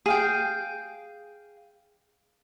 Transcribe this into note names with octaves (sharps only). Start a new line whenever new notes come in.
G#4 F5 G5